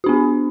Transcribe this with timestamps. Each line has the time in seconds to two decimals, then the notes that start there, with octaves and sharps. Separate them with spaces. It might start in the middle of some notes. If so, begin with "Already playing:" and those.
0.04 F#4
0.06 D4
0.09 B3